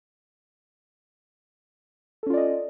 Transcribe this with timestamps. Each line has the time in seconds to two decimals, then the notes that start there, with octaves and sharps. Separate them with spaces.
2.23 A4
2.27 C#4
2.30 F4
2.34 D5
2.37 D#5